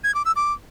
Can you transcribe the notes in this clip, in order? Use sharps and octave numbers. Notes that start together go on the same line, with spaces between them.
G#6
D6
E6
D6